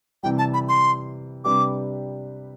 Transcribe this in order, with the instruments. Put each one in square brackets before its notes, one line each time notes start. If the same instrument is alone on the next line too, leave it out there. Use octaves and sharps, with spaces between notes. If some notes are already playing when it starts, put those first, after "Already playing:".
[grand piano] C3 E3 G3 [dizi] G5
[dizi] A5
B5
C6
[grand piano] C3 G3 D4 G4 B4 [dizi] D6